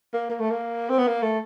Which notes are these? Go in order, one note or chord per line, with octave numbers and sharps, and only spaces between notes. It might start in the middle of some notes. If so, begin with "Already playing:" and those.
A#3
A#3
A3
A#3
C4
B3
A#3
A3